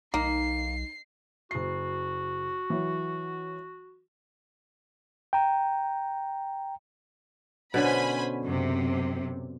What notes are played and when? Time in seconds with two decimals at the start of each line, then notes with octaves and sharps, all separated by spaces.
0.14 B1 A#3 D#4 C7
1.51 F#1 F#4 C7
2.70 E3 F#3
5.33 G5 A#5
7.74 B2 D3 C#4 C5 G#5 B5
8.45 F#2 C3